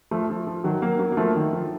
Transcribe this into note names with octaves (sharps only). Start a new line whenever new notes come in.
F3 A3
F3
F3
D#3 F#3
F#3 A#3
F#3 A#3
A#3
F3 A3
D#3
F3